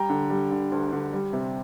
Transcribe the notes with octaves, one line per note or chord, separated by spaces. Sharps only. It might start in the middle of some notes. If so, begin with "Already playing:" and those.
Already playing: G3 G5 A#5
D3
G3
D3
D2
D3
G3
C3